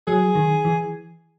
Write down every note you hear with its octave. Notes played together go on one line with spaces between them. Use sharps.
F#3 G#4
D#3
E3